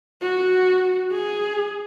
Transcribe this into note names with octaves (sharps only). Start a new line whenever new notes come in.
F#4
G#4